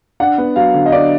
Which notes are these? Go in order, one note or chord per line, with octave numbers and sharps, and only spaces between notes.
D4 F#5
B3
F#3 F5
D3
D#5
D4 D5